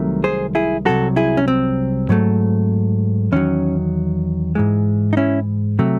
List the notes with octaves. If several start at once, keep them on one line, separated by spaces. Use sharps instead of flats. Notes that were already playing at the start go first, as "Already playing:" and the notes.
Already playing: C2 C3 D#3 F#3 A3
G#4 C5
E4 G#4
C2 C3 F#3 F#4 A4
E4 G#4
C#4
C4
G#2 F#3 A3
E2 D#3 F#3 C#4
G#2 E3 G#3
D#4
C#4 E4
C3 F#3 A3